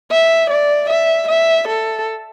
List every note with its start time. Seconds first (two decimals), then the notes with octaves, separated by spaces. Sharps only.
0.11 E5
0.50 D5
0.90 E5
1.28 E5
1.68 A4